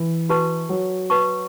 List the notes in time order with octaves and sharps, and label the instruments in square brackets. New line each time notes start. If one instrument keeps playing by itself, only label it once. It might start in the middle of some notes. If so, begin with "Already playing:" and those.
Already playing: [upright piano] E3
[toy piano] F#4 B4 A5 C#6
[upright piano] F#3
[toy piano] B4 A5 C#6